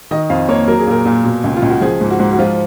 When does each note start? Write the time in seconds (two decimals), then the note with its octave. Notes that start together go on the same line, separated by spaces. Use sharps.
0.11 D#3 D#5
0.30 F2 F5
0.49 A#3 C#5
0.68 F#3 A#4
0.79 G#4
0.87 A#2 A#4
1.06 A#2
1.25 B2
1.44 C#2
1.57 F4
1.63 C#2
1.69 F#4
1.81 F3 G#4
2.01 G#2
2.10 F#4
2.20 G#2
2.33 F#4
2.39 F3 F4